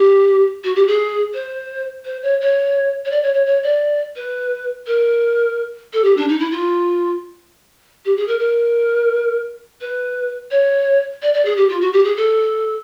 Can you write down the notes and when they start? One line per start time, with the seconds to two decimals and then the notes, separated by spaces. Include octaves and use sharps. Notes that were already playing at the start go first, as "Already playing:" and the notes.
Already playing: G4
0.64 F#4
0.76 G4
0.88 G#4
1.34 C5
2.05 C5
2.22 C#5
2.41 C#5
3.05 C#5
3.11 D5
3.23 C#5
3.34 C#5
3.46 C#5
3.63 D5
4.16 B4
4.87 A#4
5.93 A4
6.04 G4
6.17 D4
6.29 D#4
6.40 E4
6.51 F4
8.05 G4
8.17 G#4
8.28 A#4
8.39 A#4
9.81 B4
10.51 C#5
11.22 D5
11.34 D5
11.45 G#4
11.57 G4
11.69 F4
11.81 F#4
11.93 G4
12.05 G#4
12.17 A4